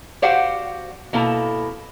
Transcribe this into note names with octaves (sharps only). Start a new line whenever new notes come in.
F#4 G4 C5 D5 F5 F#5
B2 A#3 E4 A4 A#5